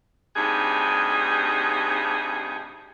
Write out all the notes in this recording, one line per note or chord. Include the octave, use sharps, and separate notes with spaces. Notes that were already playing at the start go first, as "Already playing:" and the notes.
D2 G2 C3 D#4 G#4